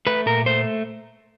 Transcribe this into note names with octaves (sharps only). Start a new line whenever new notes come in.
A3 B4
A#2 A#4
A3 C5